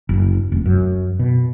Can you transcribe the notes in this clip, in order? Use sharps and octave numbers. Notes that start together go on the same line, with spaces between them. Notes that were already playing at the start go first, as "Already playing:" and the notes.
F#1
F1
F#2
B2